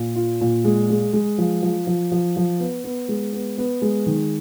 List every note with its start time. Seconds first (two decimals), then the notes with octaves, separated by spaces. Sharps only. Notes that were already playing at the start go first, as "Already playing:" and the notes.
Already playing: A#2
0.15 F4
0.41 A#2
0.64 G#3
0.90 G#3
1.13 G#3
1.38 F3
1.62 F3
1.87 F3
2.12 F3
2.36 F3
2.60 B3
2.84 B3
3.08 G#3
3.33 B3
3.58 B3
3.82 G#3
4.06 D#3